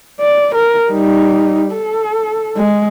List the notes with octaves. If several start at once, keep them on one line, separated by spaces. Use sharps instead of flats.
D5
A#4
G3 D#4
A4
G#3